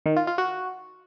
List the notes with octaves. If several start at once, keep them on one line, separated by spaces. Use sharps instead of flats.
D#3
F4
F4
F#4